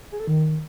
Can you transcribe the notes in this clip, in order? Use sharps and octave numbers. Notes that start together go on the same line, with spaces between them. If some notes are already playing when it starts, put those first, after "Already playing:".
G#4
A4
D#3